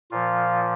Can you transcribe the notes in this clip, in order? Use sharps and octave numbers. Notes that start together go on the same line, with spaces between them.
A#2 F3 F4